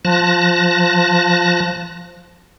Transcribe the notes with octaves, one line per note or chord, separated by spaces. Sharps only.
F3 A5 F#6 A#6